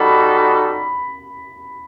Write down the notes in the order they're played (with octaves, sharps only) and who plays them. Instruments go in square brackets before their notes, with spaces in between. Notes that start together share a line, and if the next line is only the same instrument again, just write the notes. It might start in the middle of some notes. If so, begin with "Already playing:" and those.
Already playing: [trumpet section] G3 D#4 F#4 A4 [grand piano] B5